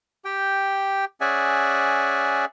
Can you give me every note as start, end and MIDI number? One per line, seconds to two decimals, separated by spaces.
0.25 1.05 67
0.25 1.05 79
1.21 2.45 61
1.21 2.45 68
1.21 2.45 74
1.21 2.45 76
1.21 2.45 78
1.21 2.45 80